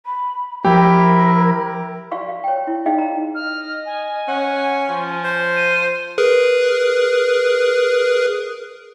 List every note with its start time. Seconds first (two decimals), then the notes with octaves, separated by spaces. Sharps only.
0.06 B5
0.65 F3 E4 G4 A#4
2.11 F4 F#4 D5 F5 C#6
2.29 F5
2.44 C#5 G5
2.67 E4
2.86 D#4 G#4 D5 D#5 F5 G5
2.98 A#5
3.35 D#5 F6
3.86 G#5
4.28 C#4 F#5
4.90 F3
5.24 C5
5.56 D#7
6.18 G#4 A#4 B4